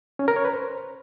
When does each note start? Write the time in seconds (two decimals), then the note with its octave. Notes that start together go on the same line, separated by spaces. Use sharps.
0.19 C#4
0.28 A#4
0.36 C#5
0.45 B4
0.53 C5